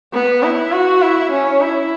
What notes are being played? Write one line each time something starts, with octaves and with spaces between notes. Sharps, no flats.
B3
E4
F#4
E4
C#4
E4